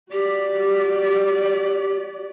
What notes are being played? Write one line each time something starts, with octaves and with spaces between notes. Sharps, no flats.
F#4 G4 D5